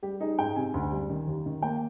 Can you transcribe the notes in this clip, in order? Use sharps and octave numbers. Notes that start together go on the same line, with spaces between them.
G3 G4
D#4 G#4
G#2 G5
C3 G#5
D2
G3
D#3
D#2
D#3
A#3 G5